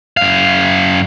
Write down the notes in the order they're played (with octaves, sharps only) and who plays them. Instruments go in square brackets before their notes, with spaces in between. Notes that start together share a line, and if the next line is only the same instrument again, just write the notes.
[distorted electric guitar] F#2 F5